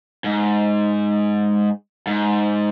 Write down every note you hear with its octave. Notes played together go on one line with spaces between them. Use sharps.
G#2
G#2